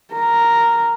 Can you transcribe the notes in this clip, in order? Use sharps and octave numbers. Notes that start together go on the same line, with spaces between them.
A#4